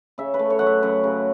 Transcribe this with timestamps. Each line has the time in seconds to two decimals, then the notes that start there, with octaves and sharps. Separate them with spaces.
0.18 C#3 E5
0.34 B4
0.39 A3
0.50 C#5
0.59 F#2 F#5
0.67 E5
0.83 F#2
1.04 C#3